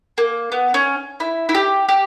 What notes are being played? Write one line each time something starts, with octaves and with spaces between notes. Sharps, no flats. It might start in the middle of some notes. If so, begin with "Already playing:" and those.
A#3
B3
C#4
E4
E4
G4
G4